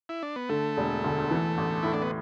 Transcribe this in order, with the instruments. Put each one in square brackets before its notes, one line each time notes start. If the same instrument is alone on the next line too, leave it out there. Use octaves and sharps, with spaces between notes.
[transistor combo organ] E4
D4
B3
[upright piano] D3 [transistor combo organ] A3
[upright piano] E1
D2
E3
A1
[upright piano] A2 [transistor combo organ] E4
[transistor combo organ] D4
B3